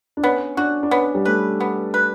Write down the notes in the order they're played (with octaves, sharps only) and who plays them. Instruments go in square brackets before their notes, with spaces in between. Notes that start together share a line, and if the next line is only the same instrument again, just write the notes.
[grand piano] D4
[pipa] B3 [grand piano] C#4
[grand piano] D4 [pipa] F#4
[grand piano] D4
[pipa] B3 [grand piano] C#4
[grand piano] G3
[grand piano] A3 [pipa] B4
[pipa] B3
B4